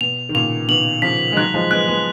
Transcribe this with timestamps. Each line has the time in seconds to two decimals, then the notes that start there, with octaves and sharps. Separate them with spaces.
0.01 B2 F7
0.29 D#3
0.34 A#2 C#3 F7
0.69 B2 D#3 F#7
1.02 C#3 F3 B6
1.32 G#3
1.36 D#3 F#3 F#6
1.54 F3 G#3
1.71 G#3 B3 F#6
1.87 G#3 B3